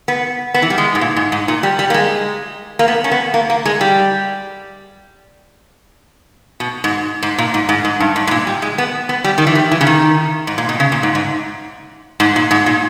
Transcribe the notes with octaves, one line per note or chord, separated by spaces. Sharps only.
B3
B3
E3
G3
G#3
G#2
A#2
G#2
G#2
A#2
G3
G3
A#3
G#3
A#3
B3
C#4
B3
A#3
A#3
G#3
G3
B2
G#2
G#2
A#2
G#2
G#2
G#2
G2
G#2
G#2
A#2
G3
G#3
B3
B3
G3
D#3
E3
G3
E3
C#3
D#3
G#2
A#2
B2
C#3
A#2
G#2
G#2
G#2
A#2
G#2
A#2